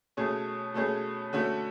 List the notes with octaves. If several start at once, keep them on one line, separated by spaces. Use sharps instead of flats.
B2 A3 C#4 G#4
B2 A3 C#4 G#4
D3 A3 C#4 F#4